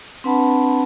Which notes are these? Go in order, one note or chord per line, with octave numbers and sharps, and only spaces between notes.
C4 D4 B4 F#5 A5 B5